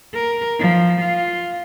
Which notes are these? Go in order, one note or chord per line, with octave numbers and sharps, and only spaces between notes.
A#4
F3
F4